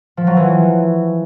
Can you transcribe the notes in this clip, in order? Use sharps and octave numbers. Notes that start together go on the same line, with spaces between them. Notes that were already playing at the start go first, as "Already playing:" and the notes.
F3
F#3
E3